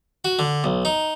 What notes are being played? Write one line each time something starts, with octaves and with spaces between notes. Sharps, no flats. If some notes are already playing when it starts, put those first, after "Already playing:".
F#4
D3
B1
D#4